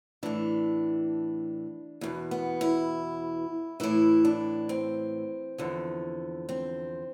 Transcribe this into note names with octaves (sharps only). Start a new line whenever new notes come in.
A2 E3 D4
E2 B2
B3
E4
A2 E3 E4
D4
C4
E2 D3 F3
C4